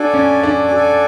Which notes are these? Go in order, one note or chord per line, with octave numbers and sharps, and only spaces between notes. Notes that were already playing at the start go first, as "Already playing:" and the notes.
Already playing: D4 F#4 A4 D5 G#5
C#4
D4
F#4 A4 D5 G#5